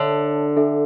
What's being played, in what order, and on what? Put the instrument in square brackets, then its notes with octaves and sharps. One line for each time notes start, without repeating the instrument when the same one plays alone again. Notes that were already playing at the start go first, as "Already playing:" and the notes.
Already playing: [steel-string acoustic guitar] D3 [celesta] C#5 E5 A5
[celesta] D4 A4 E5